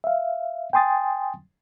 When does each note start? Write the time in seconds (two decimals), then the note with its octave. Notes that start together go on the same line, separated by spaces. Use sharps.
0.04 E5 F5
0.73 G5 G#5 C6 D#6 A6